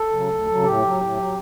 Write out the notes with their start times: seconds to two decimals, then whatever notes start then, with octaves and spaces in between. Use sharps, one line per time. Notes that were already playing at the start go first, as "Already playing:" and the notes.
Already playing: A4
0.11 C#3 F#3
0.29 D2
0.47 C#3 F#3
0.64 A2 G4
0.82 F#3
1.00 A2
1.17 F#3